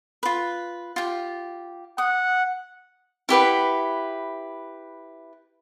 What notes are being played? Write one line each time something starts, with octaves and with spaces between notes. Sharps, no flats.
F4 B4
F4 G4
F#5 D#6
E4 G4 B4 F#5